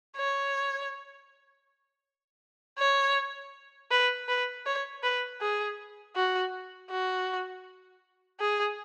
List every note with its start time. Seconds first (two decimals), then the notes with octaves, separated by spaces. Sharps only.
0.17 C#5
2.78 C#5
3.91 B4
4.28 B4
4.66 C#5
5.03 B4
5.41 G#4
6.16 F#4
6.90 F#4
8.39 G#4